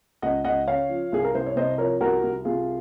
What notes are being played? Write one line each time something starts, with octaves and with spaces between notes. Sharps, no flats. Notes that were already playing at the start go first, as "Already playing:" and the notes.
C#2 D#5 F#5
C#2 D#5 F#5
C#3 C#5 F5
F3
C2 G#4
A#4
C2 C5
C#5
C3 C5 D#5
F3 A#4 C#5
C2 F#4 A#4
C2
C3 F4 G#4